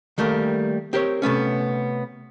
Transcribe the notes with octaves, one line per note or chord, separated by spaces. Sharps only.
D#3 G3 A3 A#3 A#4
C4 G4 A#4 C5 C#5
C3 A3 B3 C#4